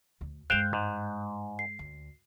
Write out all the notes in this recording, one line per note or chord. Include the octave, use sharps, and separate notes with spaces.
D2
G2 G#3 C5 F5 G5 F#6 G6
G#2
C7
D2